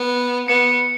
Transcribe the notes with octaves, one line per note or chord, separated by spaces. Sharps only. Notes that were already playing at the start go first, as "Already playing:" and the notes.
Already playing: B3
B3 C#7